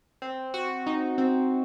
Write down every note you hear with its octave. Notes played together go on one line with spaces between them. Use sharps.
C4
F#4
D#4
C4